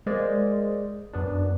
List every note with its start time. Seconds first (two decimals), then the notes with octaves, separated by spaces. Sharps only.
0.06 G#3 A#3 C5 D5
1.13 F#2 B3 D4